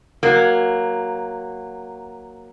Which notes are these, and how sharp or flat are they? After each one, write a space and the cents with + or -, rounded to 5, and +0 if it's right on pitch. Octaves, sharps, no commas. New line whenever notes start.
F#3 +0 A#3 +0